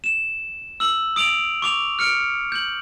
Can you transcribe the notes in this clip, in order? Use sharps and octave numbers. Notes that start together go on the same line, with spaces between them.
E7
E6 F#7
D#6 D7 F7 F#7
C#6 D6 F7
F6 C#7 D7
G6 F#7